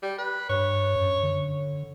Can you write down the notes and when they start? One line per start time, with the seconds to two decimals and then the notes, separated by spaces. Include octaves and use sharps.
0.03 G3
0.18 B4
0.49 G2 C#5
0.96 F#2
1.23 D3